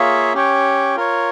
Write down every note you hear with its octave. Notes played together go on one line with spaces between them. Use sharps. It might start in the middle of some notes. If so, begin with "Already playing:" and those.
Already playing: A#3 F4 G#4 C#5 E5
C#4 G4 C#5 G5
F4 A#4 C#5